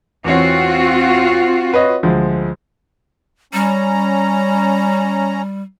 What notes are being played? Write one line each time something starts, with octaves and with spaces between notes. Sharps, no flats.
E2 C4 F4 F#4 C#5
B4 C#5 D#5
D2 F3 G#3
G3 C#4 A#5